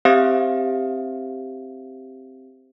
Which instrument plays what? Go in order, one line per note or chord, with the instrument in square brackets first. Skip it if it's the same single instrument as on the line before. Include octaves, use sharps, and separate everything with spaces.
[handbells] C4 G4 C5 E5 F5 D#6